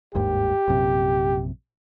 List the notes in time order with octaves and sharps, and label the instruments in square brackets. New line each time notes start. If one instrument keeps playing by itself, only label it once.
[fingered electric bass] G1 D#2 G#2 [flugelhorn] G4
[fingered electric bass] A#1 F#2 C3